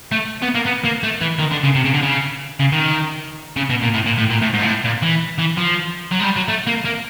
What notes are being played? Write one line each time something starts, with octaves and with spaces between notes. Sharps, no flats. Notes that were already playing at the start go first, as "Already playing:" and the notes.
A3
B3
A#3
B3
A#3
A3
E3
D#3
D3
C#3
C3
C#3
D3
C#3
C#3
D#3
C#3
B2
A#2
A2
A#2
A2
A#2
A2
G#2
A#2
A2
A#2
E3
E3
F3
F#3
G#3
G3
F#3
A3
A#3
A#3